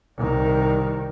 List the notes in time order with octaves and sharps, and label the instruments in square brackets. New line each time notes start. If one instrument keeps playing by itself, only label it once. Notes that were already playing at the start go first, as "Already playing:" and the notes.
[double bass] C2 D#3